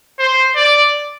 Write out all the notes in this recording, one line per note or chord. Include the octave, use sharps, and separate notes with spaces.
C5
D5